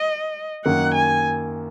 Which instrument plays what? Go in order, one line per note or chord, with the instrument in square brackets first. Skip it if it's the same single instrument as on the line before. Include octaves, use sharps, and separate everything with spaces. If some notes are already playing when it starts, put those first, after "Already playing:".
Already playing: [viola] D#5
[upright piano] F#2 D#3 A#3 [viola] F#5
[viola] G#5